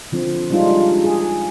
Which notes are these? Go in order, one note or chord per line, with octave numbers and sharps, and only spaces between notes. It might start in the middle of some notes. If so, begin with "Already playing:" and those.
D3 F3 C4
G3 G#3 D4 D#4 F4
G#4